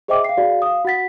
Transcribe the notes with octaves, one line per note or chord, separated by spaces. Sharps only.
G#4 C5 D#5 E5 G5 D6
F5 C7
F#4 G#4 D5 F5
F5 D#6
F#4 F#5 A6 B6